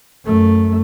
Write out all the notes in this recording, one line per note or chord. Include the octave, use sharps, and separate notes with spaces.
F#2 A3